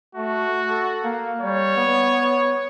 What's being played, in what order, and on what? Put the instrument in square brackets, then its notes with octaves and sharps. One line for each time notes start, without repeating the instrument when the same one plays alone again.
[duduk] A3 [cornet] F#4
[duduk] A4
A#3
[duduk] G3 [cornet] C#5
[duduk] B3